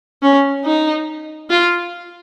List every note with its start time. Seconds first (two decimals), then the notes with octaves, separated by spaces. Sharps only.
0.22 C#4
0.64 D#4
1.50 F4